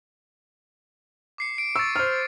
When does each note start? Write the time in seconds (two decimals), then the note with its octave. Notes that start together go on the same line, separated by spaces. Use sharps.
1.38 D6 C7 C#7
1.58 D7
1.76 C#6 E6 A6
1.96 C5 F6